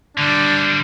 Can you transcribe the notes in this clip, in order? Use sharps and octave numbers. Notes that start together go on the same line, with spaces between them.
D3 G3 D4